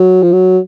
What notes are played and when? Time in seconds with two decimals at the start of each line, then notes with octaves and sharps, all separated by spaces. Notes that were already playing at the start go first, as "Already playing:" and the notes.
Already playing: F#3
0.22 F3
0.32 F#3